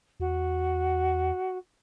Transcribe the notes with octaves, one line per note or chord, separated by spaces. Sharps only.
E2 F#4